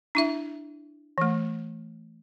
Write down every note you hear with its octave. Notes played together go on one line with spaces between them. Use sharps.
D4 E4 E5
E3 A3